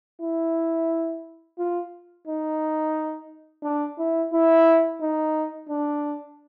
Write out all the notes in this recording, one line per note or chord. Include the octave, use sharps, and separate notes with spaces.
E4
F4
D#4
D4
E4
E4
D#4
D4